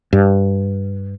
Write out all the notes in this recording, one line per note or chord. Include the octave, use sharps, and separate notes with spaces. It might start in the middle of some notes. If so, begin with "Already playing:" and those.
G2